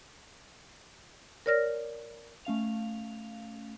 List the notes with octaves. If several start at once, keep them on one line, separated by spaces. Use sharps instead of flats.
A#4 C#5 D5 F6 A#6
A3 C#4 F5 F7